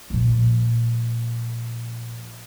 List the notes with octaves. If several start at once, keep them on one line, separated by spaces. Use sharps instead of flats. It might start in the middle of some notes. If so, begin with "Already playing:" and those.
A#2 F3